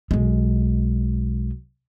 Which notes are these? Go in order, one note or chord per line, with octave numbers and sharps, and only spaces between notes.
B1 G#3